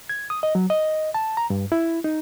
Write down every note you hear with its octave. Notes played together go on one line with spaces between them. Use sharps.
G#6
D#6
D#5
F#3
D#5
A5
A#5
G2
E4
D#4